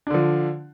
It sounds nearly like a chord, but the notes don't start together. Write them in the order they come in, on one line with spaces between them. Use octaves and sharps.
D4 D3 F3